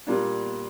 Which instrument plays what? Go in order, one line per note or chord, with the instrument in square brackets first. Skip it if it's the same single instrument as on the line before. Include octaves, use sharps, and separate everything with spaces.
[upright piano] A#2 G3 A#3 D4